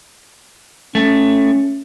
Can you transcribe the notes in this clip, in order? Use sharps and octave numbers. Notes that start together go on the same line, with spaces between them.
A3 C#4